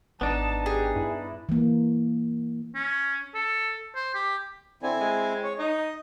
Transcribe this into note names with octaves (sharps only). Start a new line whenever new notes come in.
G#1 B3 D4 D#4 A5
G4 G#4
G2 E4
E3 A#3
C#4
A4
C5
G4
D3 C4 E4 G#5
G#3
C#5
D#4 D#5